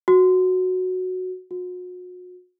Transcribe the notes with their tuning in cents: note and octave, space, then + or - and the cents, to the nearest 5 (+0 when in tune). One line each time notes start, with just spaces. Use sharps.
F#4 -5
F#4 -40